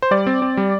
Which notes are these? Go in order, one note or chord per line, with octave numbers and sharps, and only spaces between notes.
C5
G3 D5
C4
C4
G3